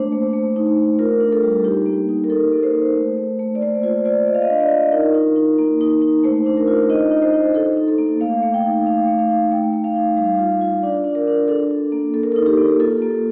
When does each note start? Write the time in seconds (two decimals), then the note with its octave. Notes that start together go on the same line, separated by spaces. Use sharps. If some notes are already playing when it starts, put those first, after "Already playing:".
Already playing: A3 A#3 D4 C5
0.12 A3
0.33 A3
0.56 D#4
0.78 A3
0.99 F4 A#4
1.21 D4
1.32 A4
1.43 G3
1.64 D#4 G4
1.86 A#3
2.09 D#4
2.24 A#4
2.30 D#4 A4
2.53 A#3
2.63 C5
2.74 D#4
2.96 A3
3.18 A3
3.39 A3
3.55 D5
3.61 A#3 C5
3.83 F4 C5
4.05 F4 D5
4.27 F4 D#5
4.35 F5
4.42 D#5
4.50 D4
4.60 D5
4.70 F4
4.92 D#4 A#4
5.14 D#4
5.36 D#4
5.59 A#3
5.81 D#4
6.02 D#4
6.24 A3 C5
6.46 D4
6.57 A#4
6.68 F4
6.89 D#4 D#5
7.11 D#4
7.22 C5
7.34 D#4
7.54 D#4 A4
7.77 D#4
7.88 A4
7.98 A#3
8.20 A3 F5
8.43 A3
8.54 G5
8.65 D#4
8.86 A3 F5
9.08 A3
9.19 F5
9.29 D#4
9.52 A3 G5
9.73 A3
9.84 F5
9.95 D#4
10.17 G3 F5
10.39 F4
10.61 F4
10.82 D4 D5
11.04 D4
11.15 A#4
11.27 D4
11.48 D4 A4
11.71 D4
11.92 A#3
12.14 A#3 A4
12.23 A#4
12.32 D#4 A4
12.46 G4
12.58 A#3
12.80 F4 A4
13.02 A#3